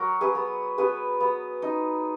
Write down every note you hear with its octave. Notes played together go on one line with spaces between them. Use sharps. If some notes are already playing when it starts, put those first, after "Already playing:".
Already playing: F#3 F#4 A#4
G#4 B4
B3
B3 G#4 B4
B3
D#4